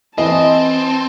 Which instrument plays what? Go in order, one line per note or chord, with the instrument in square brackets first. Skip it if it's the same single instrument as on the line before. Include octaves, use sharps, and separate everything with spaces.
[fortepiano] E3 [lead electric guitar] C4 [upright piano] D#5 [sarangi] A5